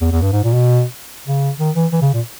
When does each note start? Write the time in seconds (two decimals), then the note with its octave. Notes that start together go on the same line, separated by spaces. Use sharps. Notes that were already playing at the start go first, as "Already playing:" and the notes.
0.01 E2
0.11 E2
0.22 G2
0.32 G#2
0.43 A#2
0.53 B2
1.27 C#3
1.59 D#3
1.75 E3
1.92 E3
2.02 C#3
2.13 A#2